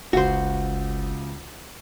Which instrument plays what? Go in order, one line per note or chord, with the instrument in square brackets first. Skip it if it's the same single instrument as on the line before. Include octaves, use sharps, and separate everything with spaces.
[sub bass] F#1 [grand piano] C#2 [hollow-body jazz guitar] F#4 C5